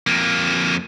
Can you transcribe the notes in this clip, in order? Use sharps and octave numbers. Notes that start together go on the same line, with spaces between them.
F2 A#3